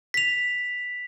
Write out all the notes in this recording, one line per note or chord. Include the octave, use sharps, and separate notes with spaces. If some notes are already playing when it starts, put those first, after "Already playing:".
B6 F7